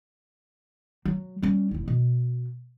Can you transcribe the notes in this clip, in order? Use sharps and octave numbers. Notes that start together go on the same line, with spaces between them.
F#3
G3 C#4
E1 E4
B2